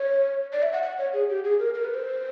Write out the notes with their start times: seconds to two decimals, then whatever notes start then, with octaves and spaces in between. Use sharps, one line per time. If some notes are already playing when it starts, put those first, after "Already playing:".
Already playing: C#5
0.53 D5
0.63 E5
0.73 F#5
0.83 F#5
0.98 C#5
1.13 G#4
1.29 G4
1.44 G#4
1.59 A#4
1.74 A#4
1.84 B4
1.94 C5